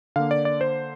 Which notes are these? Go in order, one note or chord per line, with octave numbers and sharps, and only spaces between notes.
D3 A#3 F5
D5
D5
C5